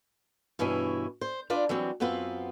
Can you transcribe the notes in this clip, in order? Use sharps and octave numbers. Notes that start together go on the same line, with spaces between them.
G2 B2 E3 C#4 E4
C5
D4 F4 B4 D5
E3 F#3 G3 C4
F#2 B3 C4 F4 B4